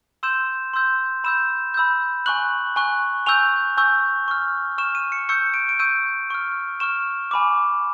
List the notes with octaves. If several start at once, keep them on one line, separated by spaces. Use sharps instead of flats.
C6 E6 G6 E7
C6 E6 G6
B5 E6 G6 E7
B5 E6 G6
G#5 C#6 F#6 F#7
G#5 C#6 F#6
G#5 C#6 E6 G6 F7
G#5 C#6 E6 G6
C#6 F6
C#6 F6 E7
D#7
C#7
C#6 E6 G6 C#7
D7
D7
C#6 E6 G6 D#7
C#6 F6
C#6 F6 E7
G#5 B5 D6